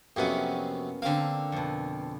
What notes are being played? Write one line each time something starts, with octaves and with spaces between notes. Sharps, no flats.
F2 C3 F#3 A#3 B3 C#4
D3 A#3 C4 F5
F2 B2